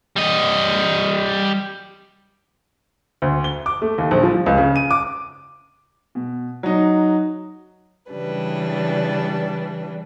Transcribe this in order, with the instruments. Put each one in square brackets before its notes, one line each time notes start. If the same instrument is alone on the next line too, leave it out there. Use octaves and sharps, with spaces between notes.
[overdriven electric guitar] G3 D#5
[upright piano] D2
G7
D6
A3
D#2
A#1
F3
F3
C#2
C#3
D#7
D6
[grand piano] B2
F#3 D#4
[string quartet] C#3 E3 G3 D4 B4